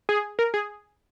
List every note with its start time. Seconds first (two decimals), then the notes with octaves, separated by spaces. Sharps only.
0.09 G#4
0.39 A#4
0.54 G#4